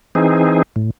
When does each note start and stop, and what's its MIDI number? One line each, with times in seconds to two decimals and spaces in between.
0.15 0.62 52
0.15 0.62 60
0.15 0.62 63
0.15 0.62 68
0.76 0.91 45